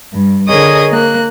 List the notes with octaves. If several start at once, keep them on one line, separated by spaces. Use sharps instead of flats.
G2
D3 G#4 A#4 C#5 D#5 D#6
A#3 F#6